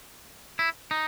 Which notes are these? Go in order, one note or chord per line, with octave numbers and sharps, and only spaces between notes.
E4
D#4